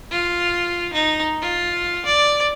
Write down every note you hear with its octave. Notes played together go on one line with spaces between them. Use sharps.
F4
D#4
F4
D5